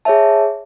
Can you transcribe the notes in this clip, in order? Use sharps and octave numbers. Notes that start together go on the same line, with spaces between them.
G#4 C#5 E5 A5